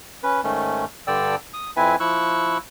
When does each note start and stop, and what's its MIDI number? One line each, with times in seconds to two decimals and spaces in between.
0.23 0.41 61
0.23 0.41 71
0.44 0.85 44
0.44 0.85 51
0.44 0.85 57
0.44 0.85 61
1.07 1.36 43
1.07 1.36 50
1.07 1.36 74
1.07 1.36 79
1.07 1.36 88
1.54 1.71 87
1.76 1.96 41
1.76 1.96 60
1.76 1.96 64
1.76 1.96 71
1.76 1.96 76
1.76 1.96 80
2.00 2.58 53
2.00 2.58 64
2.00 2.58 85
2.00 2.58 88
2.00 2.58 90